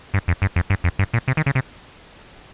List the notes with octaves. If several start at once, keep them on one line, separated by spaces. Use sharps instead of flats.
G2
F2
G2
F2
G2
F2
G2
A#2
C3
D#3
C#3
C3